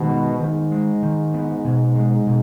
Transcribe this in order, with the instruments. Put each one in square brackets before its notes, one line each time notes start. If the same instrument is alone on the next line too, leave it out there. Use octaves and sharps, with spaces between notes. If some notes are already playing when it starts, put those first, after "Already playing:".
Already playing: [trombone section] G#2 B2 [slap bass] D#3
[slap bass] B3
[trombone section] G#2 [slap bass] D#3
[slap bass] G#3
D#3
B3
B2
G#3
B2